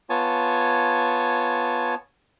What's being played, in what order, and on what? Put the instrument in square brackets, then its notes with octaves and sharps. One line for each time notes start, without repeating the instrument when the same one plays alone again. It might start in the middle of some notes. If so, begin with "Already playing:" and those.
[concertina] B3 F4 C#5 G#5 A5